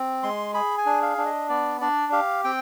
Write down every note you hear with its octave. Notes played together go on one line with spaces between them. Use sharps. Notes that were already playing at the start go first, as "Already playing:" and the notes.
Already playing: C4
G#3 C6
G#4 B5
G#5
D4
F5
D4
D#5
B3 D5
D4 D5
G4 F5
C4 G5